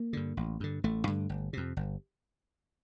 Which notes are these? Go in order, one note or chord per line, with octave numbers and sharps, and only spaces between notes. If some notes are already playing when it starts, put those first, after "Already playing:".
Already playing: A#3
G2 D3
A1
G2 D3
A1 A3
G2 D3
G1
F2 C3
G1